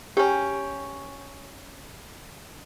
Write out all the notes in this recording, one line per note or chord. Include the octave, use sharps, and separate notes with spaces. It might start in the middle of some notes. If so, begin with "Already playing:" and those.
F#3 C#4 G4 G5